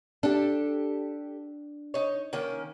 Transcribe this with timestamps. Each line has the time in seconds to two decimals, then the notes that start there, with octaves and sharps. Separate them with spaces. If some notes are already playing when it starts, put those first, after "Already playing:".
0.23 D4 G4 A4
1.94 D#4 C#5
2.33 D#3 A#3 C#4